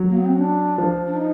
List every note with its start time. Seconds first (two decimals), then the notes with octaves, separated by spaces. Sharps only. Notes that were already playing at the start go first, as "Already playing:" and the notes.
Already playing: F#3
0.09 A#3
0.17 B3
0.25 C4
0.33 C#4
0.40 D4
0.78 F3
1.06 D4
1.16 D#4